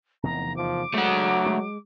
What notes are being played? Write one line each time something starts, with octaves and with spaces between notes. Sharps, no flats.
F1 E2 D#3 A#5
F3 D6
F#3 G#3 A3 F#5
G#3